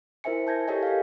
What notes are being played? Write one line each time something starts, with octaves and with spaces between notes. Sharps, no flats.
E4 A#4 C5 E5 G#5 C#7
A5 G6 G#6 A#6
G4 A4 A#4 C#5 D#5 G#5
G4 F5